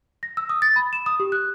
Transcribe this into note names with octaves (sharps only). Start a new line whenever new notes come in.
A#6
E6
D#6
A6
B5
E7
D#6
G4
F#6